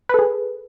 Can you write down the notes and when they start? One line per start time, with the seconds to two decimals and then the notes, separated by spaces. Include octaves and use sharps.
0.09 B4
0.14 A4
0.19 G#4